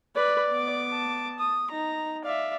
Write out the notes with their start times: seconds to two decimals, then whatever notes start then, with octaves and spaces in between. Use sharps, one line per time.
0.16 B4 D5
0.51 B3 D6
0.90 A5
1.39 D#6
1.71 D#4 A#5
2.24 D5 E5 F5